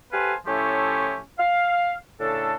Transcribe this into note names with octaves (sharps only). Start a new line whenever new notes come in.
G4 A4 B4 C5 F5 G#5
A2 F3 A3 C#4 E4 G4
F5
A2 C#3 D4 A4